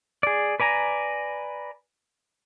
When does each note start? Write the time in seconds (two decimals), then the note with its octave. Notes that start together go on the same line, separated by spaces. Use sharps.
0.23 G#4 D5
0.60 B4 D5 G#5 A#5